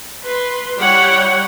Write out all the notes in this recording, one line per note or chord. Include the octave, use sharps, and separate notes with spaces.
B4 C6
G3 E4 C#5 F#5 G5